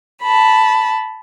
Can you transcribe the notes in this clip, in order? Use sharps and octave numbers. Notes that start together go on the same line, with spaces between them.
A5 B5